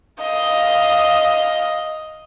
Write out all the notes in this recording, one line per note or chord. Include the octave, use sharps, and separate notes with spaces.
D#5 F5